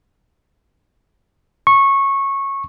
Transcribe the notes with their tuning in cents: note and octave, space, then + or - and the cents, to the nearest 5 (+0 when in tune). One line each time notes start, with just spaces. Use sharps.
C#6 -15